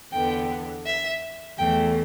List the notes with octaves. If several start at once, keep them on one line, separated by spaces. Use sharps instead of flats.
E2 D3 B3 G5
E5
E2 E3 A3 G5